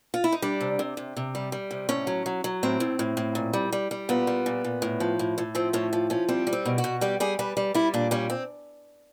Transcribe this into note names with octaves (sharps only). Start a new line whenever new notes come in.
F4
E4
D#4
G3 D4
C3
C3
C3
C3
G3
G3
C3
A2 C#4
F#3
F#3
F#3
A2 C4
A2
A2
A2
A#2
G3
G3
G3
A#2 B3
G3
A#2
A#2
A2
F3
A2
A2
F3 C4
A2 C#4
F3
F3 C#4
G3 C4
G3
C4
B2
F#4
B2
G3 G4
G3 G#4
G3 B4
G3
G3 E4
A#2 D4
G3 C#4
C4